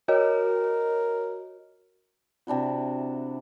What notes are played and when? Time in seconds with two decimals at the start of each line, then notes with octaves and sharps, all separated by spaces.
0.08 F#4 A#4 C#5 D#5
2.47 C3 D4 E4 F#4